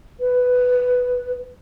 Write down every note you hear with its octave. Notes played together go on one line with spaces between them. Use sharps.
B4